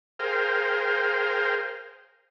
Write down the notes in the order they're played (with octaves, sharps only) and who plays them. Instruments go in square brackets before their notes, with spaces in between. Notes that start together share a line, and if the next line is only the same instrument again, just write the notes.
[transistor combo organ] G#4 A#4 C5 F5 G5